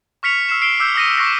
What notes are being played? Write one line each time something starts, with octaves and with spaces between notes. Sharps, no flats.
C#6 F6 B6 C#7 F7
E6 F6 C7 E7
E6 C7 D7 F7 G7
D6 E6 G6
D#6 A#6 D#7
C#6 D6 F#6 A#6 C7